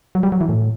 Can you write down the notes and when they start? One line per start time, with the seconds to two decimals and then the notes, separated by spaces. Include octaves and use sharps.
0.15 F#3
0.23 G3
0.32 F#3
0.41 E3
0.49 A2